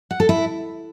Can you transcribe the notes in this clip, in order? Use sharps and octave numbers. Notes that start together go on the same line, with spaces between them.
F#5
A4
E4